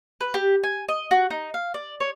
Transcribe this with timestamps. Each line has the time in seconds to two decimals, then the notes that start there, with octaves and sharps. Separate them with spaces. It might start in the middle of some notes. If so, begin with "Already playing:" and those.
0.21 B4
0.34 G4
0.63 G#5
0.89 D#5
1.11 F#4
1.30 D#4
1.54 F5
1.74 D5
2.00 C#5